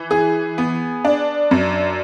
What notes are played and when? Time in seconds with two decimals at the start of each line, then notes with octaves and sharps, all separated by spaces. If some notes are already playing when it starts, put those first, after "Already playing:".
Already playing: E3
0.11 G#4
0.58 B3
1.05 D4
1.51 F#2